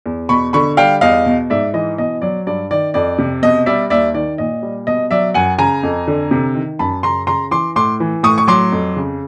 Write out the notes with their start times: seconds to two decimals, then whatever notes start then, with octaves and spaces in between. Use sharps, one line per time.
0.06 E2
0.29 B2 B5 C#6
0.53 D3 B5 C#6
0.77 G3 F5 G5
1.01 E2 D#5 F5
1.26 B2
1.50 G#2 D5 E5
1.73 E3 D#5
1.98 B2 D#5
2.22 F#3 D5
2.47 G2 D5
2.71 D#3 D5
2.94 F2 D5
3.18 C3
3.42 B2 D#5
3.66 G3 D5 E5
3.90 D#2 D5 E5
4.14 D#3 D5
4.38 A#2 D#5
4.63 G3
4.87 B2 D#5
5.11 F#3 D5 E5
5.34 F#2 F#5 G#5
5.58 C#3 G#5 A#5
5.83 F2
6.08 D3
6.31 C3
6.55 D#3
6.79 F#2 A5 B5
7.03 C#3 A#5 C6
7.27 C#3 A#5 C6
7.51 E3 C6 D6
7.76 A2 C6 D6
8.00 E3
8.23 A2 C#6 D#6
8.38 C#6
8.47 F#3 C6 D6
8.72 F2
8.97 C#3